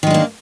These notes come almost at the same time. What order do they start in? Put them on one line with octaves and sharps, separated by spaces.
D#3 G#3 D4 A#3